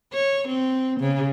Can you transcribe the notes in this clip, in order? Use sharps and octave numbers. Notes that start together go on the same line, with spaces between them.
C#5
C4
C#3